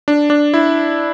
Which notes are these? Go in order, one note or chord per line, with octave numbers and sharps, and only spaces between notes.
D4
D4
E4